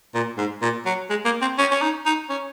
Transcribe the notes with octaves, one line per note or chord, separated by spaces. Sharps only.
A#2
G#2
A#2
F#3
G#3
A#3
C4
C#4
C#4
D#4
D#4
C#4